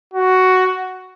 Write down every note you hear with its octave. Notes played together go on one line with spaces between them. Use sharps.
F#4